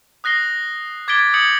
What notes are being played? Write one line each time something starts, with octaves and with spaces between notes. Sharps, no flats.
D#6 F#6 A#6 C7 G7
D6 G#6 A6 B6 D7 G7
D#6 G6 G#6 C#7 F#7